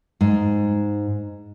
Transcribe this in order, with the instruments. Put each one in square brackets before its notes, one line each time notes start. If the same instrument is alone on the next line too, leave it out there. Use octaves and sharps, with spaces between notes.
[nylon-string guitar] G#2